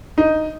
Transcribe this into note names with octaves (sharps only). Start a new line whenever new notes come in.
D#4